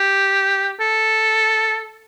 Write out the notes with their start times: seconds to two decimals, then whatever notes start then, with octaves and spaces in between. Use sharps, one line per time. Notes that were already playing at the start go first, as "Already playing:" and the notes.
Already playing: G4
0.81 A4